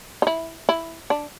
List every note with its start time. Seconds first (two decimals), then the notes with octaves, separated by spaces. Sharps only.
0.22 D#4
0.27 E4
0.69 E4
1.10 D4